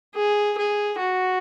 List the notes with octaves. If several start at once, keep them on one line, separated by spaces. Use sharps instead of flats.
G#4
G#4
F#4